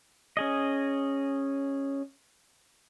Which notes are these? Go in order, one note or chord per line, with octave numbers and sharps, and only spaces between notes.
C#4 G#4 D#5